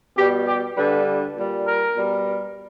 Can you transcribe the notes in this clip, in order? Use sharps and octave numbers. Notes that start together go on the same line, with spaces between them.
B2 G3 G4
G4
G2 D3 G3 B4
A#2 G3
A#4
B2 G3